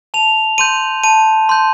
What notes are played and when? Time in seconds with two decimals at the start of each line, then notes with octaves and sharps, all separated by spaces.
0.14 A5 F7
0.58 C6 G6 D#7
1.04 A5 D#7
1.49 C6 G6